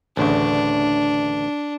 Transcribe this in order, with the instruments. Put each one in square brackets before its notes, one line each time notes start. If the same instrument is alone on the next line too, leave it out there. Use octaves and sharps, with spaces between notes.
[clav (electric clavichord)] A1 D2 C#3 [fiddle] D4